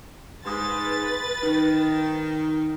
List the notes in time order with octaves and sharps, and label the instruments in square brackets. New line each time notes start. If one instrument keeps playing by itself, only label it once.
[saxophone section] G#2 [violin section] B4 A6 [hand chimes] C6 D#6
[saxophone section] D#3 [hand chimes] D#4